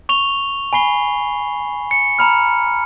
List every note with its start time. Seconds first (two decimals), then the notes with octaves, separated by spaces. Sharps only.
0.09 C#6 F7 G7
0.73 G#5 B5 C7 G7
1.91 C#7
2.19 A#5 B5 F6